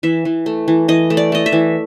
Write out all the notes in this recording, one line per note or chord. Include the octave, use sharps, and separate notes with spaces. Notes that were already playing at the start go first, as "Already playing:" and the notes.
E3 E5
E3
A3
E3
E3 D#5
A3
D5
A3 D#5
E5
E3